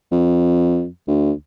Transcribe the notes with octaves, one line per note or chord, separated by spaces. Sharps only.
F2
D2